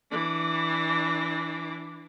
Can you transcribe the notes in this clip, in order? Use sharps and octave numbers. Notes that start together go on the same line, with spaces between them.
E3 D4